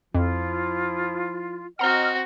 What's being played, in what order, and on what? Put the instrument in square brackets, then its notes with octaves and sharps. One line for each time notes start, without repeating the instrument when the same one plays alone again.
[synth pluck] F2 [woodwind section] F3 E4 F4
[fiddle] C4 F#4 [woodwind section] D#5 F6 [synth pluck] F#5 A#5